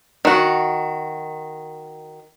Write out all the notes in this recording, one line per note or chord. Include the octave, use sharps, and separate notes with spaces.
D#3 F#4